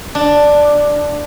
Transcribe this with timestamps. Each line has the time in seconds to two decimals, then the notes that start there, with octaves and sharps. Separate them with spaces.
0.15 D4